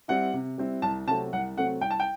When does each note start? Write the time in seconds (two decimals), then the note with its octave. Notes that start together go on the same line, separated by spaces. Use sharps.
0.08 G3 C4 E4 F#5
0.34 C3
0.58 G3 C4 E4
0.82 C2 A5
1.07 C3 F#3 A3 C4 A5
1.33 C2 F#5
1.57 C3 F#3 A3 C4 F#5
1.81 C2 G5
1.90 A5
2.00 G5